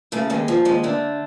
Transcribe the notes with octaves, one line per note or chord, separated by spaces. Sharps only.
C#3 A3
D#2 G#3
F3
D#2 G#3
D3 A3